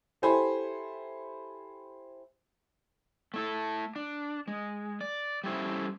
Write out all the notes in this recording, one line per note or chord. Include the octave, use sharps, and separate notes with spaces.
E4 G4 A4 C5 G#5 B5
A3 E4 A4
D4
G#3
D5
G3 A3 C#4 E4 C5